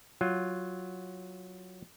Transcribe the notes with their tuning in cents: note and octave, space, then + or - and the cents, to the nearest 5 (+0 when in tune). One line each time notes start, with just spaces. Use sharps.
F#3 +0 F4 +5